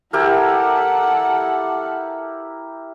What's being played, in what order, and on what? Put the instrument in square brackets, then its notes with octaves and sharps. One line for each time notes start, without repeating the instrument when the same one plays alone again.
[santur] E4 G4 A#4 [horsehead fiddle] A4 F#5